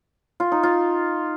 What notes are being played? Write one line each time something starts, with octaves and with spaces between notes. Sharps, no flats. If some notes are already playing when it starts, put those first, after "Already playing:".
F4
D#4
F4